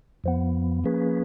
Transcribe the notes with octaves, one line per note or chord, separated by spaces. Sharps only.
F2 F3 B3
F3 A#3 C#4 G#4 B4